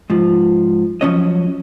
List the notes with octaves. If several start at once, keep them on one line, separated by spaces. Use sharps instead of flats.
G#2 F3
F3 F#3 C#4 C#5 D#5